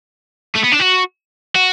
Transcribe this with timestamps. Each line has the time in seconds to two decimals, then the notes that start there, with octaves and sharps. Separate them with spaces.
0.56 A3
0.64 B3
0.73 D4
0.80 F#4
1.55 F#4